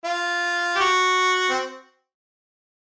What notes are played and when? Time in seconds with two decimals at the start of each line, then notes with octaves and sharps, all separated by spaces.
0.05 F4
0.76 G4
0.81 F#4
1.50 C4